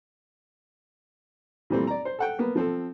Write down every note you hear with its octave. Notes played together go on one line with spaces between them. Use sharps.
A#2 E3 G3 A3 C4
D5 A#5
C5
A4 F#5 G5
A#3 B3
F3 C4 A4